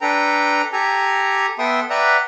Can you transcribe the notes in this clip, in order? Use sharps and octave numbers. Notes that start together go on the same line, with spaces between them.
D4 A4 B4 G5 A#5
G4 A4 G#5 A#5
B3 A4 E5 G5 C6 D#6
B4 D5 E5 F#5 G5 A#5